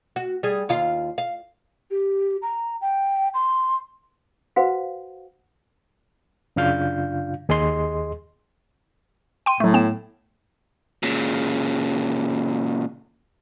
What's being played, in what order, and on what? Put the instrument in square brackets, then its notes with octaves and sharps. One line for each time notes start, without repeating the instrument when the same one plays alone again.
[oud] F#4
G3 G#4
D#2 F4 F5
F5
[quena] G4
A#5
G5
C6
[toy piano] F#4 B4 C5 F5 F#5
[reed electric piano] F#2 C#3 D4 F4 F5 G6
D#2 G#4 D#5 C6
[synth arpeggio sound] G5 C6 D#7
[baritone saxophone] A2 [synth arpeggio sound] F#3 A3
[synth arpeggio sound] B3 G5 E7
[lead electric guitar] A#2 C#3